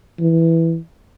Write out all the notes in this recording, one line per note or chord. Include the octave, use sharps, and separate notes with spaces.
E3